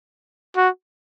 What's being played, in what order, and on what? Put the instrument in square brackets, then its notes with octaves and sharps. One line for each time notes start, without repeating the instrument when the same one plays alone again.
[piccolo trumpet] F#4